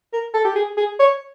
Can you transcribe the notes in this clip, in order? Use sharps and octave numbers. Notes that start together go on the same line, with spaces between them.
A#4
A4
G4
G#4
G#4
C#5